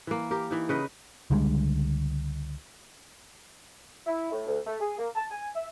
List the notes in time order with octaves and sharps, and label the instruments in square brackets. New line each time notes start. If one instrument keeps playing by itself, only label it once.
[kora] E3 A#3
G4 A#4
E3 D#4
C#3 B4 D#5
[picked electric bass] C#2 D3 G3 G#3
[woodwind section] E4
A2
D2
A3
G#4
A#3
A5
G#5
E5